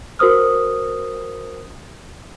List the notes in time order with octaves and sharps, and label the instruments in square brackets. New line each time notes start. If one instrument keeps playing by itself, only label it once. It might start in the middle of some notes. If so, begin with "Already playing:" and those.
[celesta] F#4 A#4 C5 D#6 F6